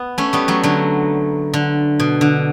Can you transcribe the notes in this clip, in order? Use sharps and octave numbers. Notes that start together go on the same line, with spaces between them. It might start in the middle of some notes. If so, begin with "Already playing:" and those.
Already playing: B3
A3 C#4
G3 B3
F#3 A3
D3 F#3
D3
B2
D3